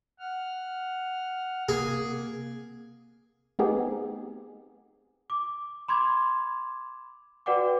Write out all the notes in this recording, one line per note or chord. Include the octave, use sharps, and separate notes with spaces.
F#5 F6
C3 A#3 G#4
A3 B3 C4 D#4 G4 G#4
D6
B5 C6 D6 G#6
F#4 B4 D5 F#5 G5 D6